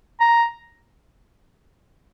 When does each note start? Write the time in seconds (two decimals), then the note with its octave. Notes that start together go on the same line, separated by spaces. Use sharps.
0.21 A#5